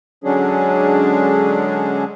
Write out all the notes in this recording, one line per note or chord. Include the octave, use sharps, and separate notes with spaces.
D3 F#3 G#3 C#4 D4 G#4